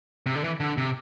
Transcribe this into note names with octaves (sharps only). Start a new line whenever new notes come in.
C3
D3
E3
D3
C3